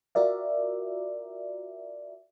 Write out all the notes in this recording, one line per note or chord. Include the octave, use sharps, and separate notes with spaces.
F4 F#4 A#4 D5 E5